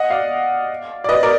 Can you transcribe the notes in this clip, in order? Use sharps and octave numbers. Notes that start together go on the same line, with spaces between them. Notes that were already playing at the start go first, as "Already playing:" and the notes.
Already playing: D#5 F#5
D5 F5
D5
B4 D#5
A#4 D5